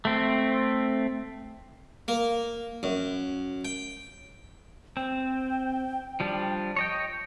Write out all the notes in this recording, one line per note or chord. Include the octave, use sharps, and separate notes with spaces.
A3 C4
A#3
F#2
G5
C4 G5
F3 G3 D4
C#5 D#5 G5